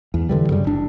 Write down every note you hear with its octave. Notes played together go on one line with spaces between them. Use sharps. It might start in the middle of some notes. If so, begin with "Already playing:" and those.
E2
E1 D3 E3 G3
F#2 C#3 G3
F#1 D4